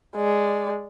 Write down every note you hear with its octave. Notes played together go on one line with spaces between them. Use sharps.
G#3 D5